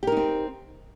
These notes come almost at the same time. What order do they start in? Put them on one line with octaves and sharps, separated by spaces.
G4 A#4 D#4 C4